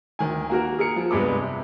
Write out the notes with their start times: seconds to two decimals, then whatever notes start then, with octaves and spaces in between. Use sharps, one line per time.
0.19 D2 D#3 G#5
0.49 A#3 F#4 A#4
0.79 G#4 A#4 C#7
0.96 F3
1.11 F1 G2 G3 G#3 B3 D6
1.41 C3